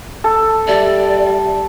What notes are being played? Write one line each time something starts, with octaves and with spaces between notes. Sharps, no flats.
A4
G3 G4 D5 E5